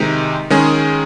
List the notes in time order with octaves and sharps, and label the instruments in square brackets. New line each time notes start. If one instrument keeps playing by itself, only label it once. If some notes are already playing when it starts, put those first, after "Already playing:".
Already playing: [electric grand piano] C3 D#3 G#3 D#4
D#3 G#3 C#4 G#4